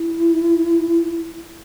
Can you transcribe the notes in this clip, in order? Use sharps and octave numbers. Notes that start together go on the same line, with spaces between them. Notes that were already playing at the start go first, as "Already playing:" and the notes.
Already playing: E4